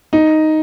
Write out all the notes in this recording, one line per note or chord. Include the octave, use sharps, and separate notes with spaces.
D#4